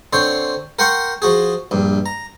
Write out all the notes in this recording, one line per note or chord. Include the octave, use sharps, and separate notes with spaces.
D3 C4 C5 C#5
A#4 F#5 G5 C6 C#6
F3 F#4 G#4
A#1 G2
A#5